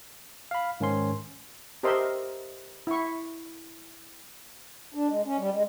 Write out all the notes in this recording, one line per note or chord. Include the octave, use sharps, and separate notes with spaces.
F5 B5
G#2 D#3 C#4 C6
G4 A#4 C5 D#5 E5 C6
E4 C#6
D4
G#3
C#4
G3
G#3